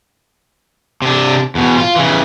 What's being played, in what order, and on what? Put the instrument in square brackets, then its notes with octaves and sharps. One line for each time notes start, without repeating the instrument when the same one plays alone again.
[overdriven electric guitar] C3 D4
E2 B2
F4
C#3 E3